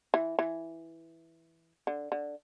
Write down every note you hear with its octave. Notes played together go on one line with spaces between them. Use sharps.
E3
E3
D3
D3